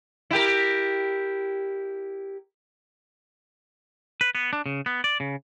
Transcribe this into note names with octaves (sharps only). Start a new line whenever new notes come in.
E4 G4 A#4
B4
B3
D4
C#3
B3
D5
C#3